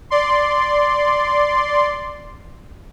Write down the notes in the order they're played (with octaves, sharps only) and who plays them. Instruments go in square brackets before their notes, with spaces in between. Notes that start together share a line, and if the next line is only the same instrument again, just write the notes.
[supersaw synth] D5 C6